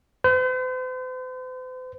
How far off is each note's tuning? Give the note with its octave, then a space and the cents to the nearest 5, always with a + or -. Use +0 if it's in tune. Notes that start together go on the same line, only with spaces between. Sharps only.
C5 -45